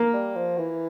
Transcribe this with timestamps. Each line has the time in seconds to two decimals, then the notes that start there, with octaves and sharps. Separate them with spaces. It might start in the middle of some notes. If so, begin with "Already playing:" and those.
Already playing: A#3
0.13 G3
0.35 F3
0.58 E3